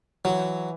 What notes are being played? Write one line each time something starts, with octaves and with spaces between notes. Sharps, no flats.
E3 F#3